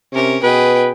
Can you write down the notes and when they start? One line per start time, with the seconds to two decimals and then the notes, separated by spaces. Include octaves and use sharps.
0.13 C3 C#4 A#4
0.43 B2 G#4 B4 G5